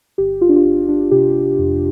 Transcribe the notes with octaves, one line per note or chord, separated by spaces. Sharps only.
G1 G4
F4
D4
F4
G1 D4
D4
C3 G4
F2